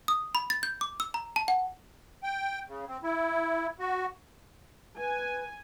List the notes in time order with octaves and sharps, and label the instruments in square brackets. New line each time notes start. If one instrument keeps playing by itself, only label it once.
[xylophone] D#6
B5
A6
G6
D6
E6
A#5
A5
F#5
[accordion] G5
C#3
C4
E4
F#4
[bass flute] B4 [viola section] G#5